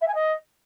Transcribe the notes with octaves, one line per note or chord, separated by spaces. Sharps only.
E5
G#5
D#5